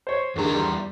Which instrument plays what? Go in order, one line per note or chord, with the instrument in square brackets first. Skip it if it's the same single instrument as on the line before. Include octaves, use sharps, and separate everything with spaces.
[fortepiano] C5 C#5
[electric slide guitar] E2 A#5 [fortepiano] D3 D#3 G#3
[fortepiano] G3 C6